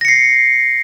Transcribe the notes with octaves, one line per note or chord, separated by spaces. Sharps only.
A#6 C7 C#7